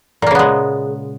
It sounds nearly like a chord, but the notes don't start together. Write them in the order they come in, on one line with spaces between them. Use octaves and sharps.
A#2 A#3 C#3 B3 G#3